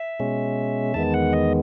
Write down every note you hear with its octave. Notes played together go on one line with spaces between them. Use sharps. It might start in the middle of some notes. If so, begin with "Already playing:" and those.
Already playing: E5
B2 G#3 C#4
E2 D#3 G#3 B3 A5
F#5
D#5